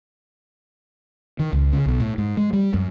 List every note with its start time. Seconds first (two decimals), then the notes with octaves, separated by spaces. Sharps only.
1.39 D#3
1.53 C#2
1.73 C#3
1.86 B1
2.00 A2
2.18 G#2
2.37 G#3
2.53 G3
2.74 F#2